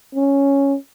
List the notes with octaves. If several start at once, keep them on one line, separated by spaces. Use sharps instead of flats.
C#4